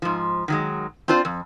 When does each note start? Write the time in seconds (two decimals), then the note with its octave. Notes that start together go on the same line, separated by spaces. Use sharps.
0.02 G#2 F3
0.48 D#3 F#3 G#3
1.08 C4 D4 F4 C5 D5
1.25 F2